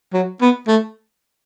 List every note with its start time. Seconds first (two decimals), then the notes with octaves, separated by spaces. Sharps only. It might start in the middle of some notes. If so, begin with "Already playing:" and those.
0.13 F#3
0.41 B3
0.68 A3